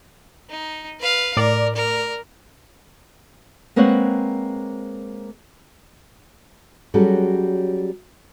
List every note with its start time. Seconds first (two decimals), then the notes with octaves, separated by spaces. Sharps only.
0.49 D#4
1.00 B4 F5
1.37 A2 A#4 D5
1.75 A#4
3.76 G#3 A#3 C4 B4 C#5 F#5
6.94 F#3 G3 C#4 F#4 G#4 A4